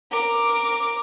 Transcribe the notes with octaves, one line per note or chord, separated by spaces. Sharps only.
A#4 D6